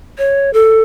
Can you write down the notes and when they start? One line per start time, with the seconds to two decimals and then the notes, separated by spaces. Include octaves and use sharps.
0.18 C#5
0.53 A4